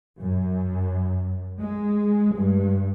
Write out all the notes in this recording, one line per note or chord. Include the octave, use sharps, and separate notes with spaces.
F#2
G#3
G2